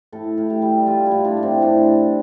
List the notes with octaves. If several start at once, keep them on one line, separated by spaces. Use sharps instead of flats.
A2 A4
A2
G4
G3
G3 F4
E4
A2
D4
A2
C4
A2 D4